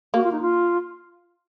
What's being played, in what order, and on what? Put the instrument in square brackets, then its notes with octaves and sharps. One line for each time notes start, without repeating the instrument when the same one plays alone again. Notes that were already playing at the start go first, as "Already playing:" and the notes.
[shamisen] A#3 [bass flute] F#4
[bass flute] F4
D#4
F4